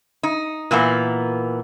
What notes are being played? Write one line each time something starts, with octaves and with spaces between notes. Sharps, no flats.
D#4
A#2 E3 A#3 B3